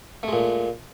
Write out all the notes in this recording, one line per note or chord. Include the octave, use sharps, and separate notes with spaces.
A#2 G#3 A3